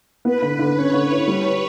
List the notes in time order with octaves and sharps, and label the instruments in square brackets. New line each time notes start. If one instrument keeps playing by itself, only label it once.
[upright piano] B3 [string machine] B4
[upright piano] D3
D3
[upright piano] C#4 [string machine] C#5
[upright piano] D3
E4
G3